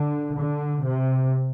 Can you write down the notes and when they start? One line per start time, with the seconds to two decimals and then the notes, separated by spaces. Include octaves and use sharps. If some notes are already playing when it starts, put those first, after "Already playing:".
Already playing: D3
0.36 D3
0.84 C3